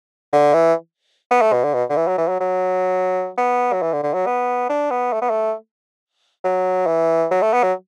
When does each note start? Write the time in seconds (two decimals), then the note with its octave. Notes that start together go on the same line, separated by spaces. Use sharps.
0.33 D3
0.54 E3
1.31 B3
1.42 A3
1.53 B2
1.64 D3
1.74 B2
1.89 D3
1.97 E3
2.08 F#3
2.18 E3
2.29 F#3
2.41 F#3
3.38 B3
3.73 F#3
3.82 E3
3.93 D3
4.03 D3
4.14 F#3
4.26 B3
4.69 D4
4.91 B3
5.13 A3
5.22 B3
5.30 A3
6.44 F#3
6.87 E3
7.31 F#3
7.42 A3
7.54 B3
7.63 F#3